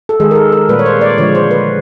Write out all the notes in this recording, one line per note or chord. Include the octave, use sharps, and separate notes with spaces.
A4
D#3 G#3 G#4
A#4
A4
A#4
A#2 G3 A#3 B4
C#5
C5
D5
D3 F3 G#3 C#5
C5
B4